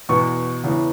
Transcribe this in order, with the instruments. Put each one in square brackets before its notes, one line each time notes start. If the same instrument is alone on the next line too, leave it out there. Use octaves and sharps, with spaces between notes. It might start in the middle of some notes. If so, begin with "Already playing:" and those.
[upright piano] E2 B2 B3 C#6
E2 C#3 E3 B3